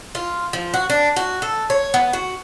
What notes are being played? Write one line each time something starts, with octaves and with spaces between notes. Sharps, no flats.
F4
F3
F#4
D4
F#4
A4
C#5
B3
F#4